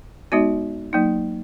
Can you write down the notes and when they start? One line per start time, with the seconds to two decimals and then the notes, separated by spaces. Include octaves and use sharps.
0.32 G#3 B3 D#4 F#4 D5
0.93 F#3 A#3 D#4